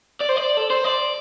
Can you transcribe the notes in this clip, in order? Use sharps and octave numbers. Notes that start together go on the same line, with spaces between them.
D5
C5
D5
A4
C5
D5